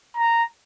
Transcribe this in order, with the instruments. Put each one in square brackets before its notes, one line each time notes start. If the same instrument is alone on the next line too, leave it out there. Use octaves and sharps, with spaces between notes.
[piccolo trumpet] A#5